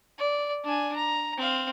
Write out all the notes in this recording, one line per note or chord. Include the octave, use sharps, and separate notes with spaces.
D5
D4 G#5
A#5
C4 F5